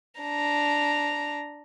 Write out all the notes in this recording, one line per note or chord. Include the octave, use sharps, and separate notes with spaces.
D4 A#5